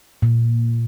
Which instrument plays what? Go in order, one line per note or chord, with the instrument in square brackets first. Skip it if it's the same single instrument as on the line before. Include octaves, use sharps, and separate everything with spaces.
[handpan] A#2